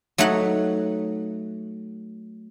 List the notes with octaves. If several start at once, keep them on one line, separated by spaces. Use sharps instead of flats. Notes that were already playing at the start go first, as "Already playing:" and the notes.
F#3 A3 D#4 C#5 F#5